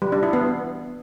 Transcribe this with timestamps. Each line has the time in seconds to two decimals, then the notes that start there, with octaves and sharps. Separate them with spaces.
0.02 G3
0.12 D4
0.23 E4
0.33 B3